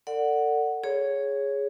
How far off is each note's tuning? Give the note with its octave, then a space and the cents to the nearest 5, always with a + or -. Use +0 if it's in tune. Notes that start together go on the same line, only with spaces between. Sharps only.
A4 +40 D5 +0 F#5 +0
G#4 +0 C#5 +0